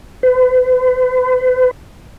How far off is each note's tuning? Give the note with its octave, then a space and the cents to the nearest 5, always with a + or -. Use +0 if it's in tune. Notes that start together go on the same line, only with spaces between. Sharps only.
B4 +45